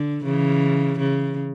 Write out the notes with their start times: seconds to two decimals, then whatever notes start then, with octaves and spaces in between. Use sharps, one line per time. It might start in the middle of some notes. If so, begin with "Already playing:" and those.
Already playing: D3
0.24 C#3 E3
0.99 C#3